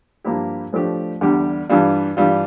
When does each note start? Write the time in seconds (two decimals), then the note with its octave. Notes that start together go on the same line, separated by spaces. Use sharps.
0.24 G2 F3 A#3 E4 G4
0.73 A2 F3 A3 D4 G4
1.21 E2 D3 G3 D4 G4
1.69 G2 E3 G3 D4 F4
2.17 G2 E3 G3 D4 F4